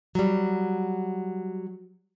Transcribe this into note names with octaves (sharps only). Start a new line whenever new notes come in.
F#3 G3